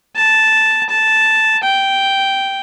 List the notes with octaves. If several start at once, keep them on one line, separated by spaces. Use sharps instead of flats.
A5
A5
G5